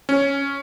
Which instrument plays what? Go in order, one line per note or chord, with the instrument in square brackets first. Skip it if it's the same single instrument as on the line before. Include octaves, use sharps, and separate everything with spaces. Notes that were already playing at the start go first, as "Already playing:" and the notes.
[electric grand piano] C#4